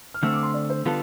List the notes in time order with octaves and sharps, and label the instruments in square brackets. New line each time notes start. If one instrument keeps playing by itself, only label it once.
[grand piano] F6
[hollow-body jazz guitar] D3 A3 C4 [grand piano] E6
[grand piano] D6
C6
D5
C5
[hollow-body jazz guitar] D3 G3 B3 F4 A4